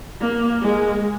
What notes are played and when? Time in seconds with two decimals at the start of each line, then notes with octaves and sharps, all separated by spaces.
0.20 A#3
0.62 G#3